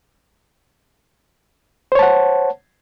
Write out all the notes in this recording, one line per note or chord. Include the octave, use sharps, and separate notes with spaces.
C5 C#5 F#5 A5